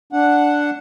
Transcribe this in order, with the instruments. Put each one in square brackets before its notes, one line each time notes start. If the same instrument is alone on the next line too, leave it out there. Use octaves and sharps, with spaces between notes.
[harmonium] D4 F#5